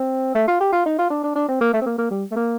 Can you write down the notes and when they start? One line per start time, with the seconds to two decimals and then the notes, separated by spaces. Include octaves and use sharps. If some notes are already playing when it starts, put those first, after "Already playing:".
Already playing: C4
0.35 A3
0.47 F4
0.60 G4
0.72 F4
0.86 D#4
0.98 F4
1.10 D4
1.23 D4
1.35 D4
1.49 C4
1.61 A#3
1.73 A3
1.81 C4
1.86 A#3
1.98 A#3
2.11 G3
2.31 A3
2.36 A#3